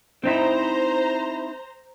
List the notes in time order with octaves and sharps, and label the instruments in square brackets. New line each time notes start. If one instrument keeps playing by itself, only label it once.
[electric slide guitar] C4 D#4 E4 [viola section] C5 A#5